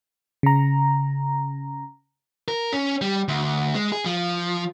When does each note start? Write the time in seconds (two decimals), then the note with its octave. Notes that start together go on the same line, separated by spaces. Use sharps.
0.43 C#3 A#5
2.48 A#4
2.72 C#4
3.01 G3
3.28 D2
3.75 G#3
3.92 G#4
4.06 F3